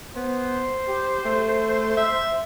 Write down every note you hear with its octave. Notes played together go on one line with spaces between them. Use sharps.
B3 C5
G4
A3
E5